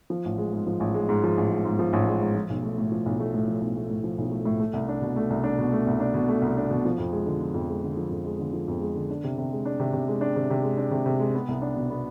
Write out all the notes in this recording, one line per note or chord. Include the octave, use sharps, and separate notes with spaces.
F3
A1
G#3
G#2
F3
A1
G#3
G#2
F3
A1
G#3
G#2
F3
A1
G#3
G#2
F3
B1
A3
A2
F3
B1
A3
A2
F3
B1
A3
A2
F3
B1
A3
A2
A3
C2
D4
B2
A3
C2
D4
B2
A3
C2
D4
B2
A3
C2
D4
B2
F3
F2
G#3
D3
F3
F2
G#3
D3
F3
F2
G#3
D3
F3
F2
G#3
D3
D4
C3
C3
G#3
D4
C3
C3
G#3
D4
C3
C3
G#3
D4
C3
C3
G#3
B3
C2
D4
B2
B3